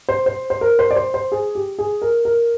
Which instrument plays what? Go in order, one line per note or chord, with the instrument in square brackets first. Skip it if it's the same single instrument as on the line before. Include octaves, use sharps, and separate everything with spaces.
[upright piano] C5
C5
C5
A#4
C5
D5
C5
C5
G#4
G4
G#4
A#4
A#4